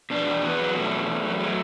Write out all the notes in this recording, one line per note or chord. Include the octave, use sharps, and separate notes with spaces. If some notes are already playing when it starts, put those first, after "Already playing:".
B2 D4
E2
E2 B3
F#3
B2 A3
E2
E2
F#3
F#3